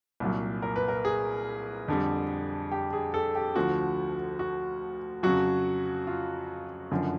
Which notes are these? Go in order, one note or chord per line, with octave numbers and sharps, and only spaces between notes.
C2 A#2 F#3
A#4
B4
A#4
G#4
F2 D3 G3
G4
G#4
A4
G4
D2 D3 F3 F#4
F#4
F2 C#3 F#3 F#4
F4
F#1 F#2 D3 F3